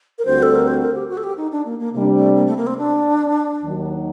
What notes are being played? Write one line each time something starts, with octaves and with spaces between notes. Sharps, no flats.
A#4
D2 D3 G3 C4 F#4 C5
A4
A#4
C5
A#4
G4
F#4
A4
G4
D#4
D4
A#3
A#3
C3 G3 A#3 D4
A3
A#3
A3
A#3
C4
D4
D#2 D#3 F#3